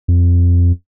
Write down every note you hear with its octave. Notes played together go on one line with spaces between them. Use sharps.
F2